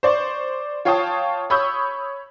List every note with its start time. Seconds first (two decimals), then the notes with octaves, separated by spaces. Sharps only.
0.03 C5 D5 C#6
0.85 F4 C#5 F5 G5 A5 D#6
1.50 C#5 B5 C#6 D#6 E6 G6